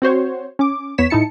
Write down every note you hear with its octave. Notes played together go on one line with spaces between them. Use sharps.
C4 F#4 C5 C#5
C#4 D6
E2 B3 C#5 B6 E7
A2 D#4 E4 A5 C#7